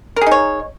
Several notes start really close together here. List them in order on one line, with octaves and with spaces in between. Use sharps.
A#4 G#4 D#4 C#5